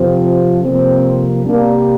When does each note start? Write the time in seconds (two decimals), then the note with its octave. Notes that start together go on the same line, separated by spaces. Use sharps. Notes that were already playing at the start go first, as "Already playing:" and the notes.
Already playing: F2 C3 F3 C4
0.62 F2 C3 G3 A#3 C4
1.45 C3 G3 A#3 D4